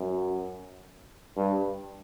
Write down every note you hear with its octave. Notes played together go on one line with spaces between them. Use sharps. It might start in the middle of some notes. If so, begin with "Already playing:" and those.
Already playing: F#2
G2